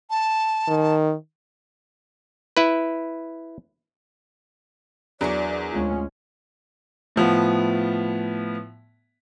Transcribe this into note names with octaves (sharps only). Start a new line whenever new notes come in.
A5
D#3
E4 B4
E2 F#3 D4 A#4 C#5 D5
D2 G#3 C#4 F4
A2 F3 B3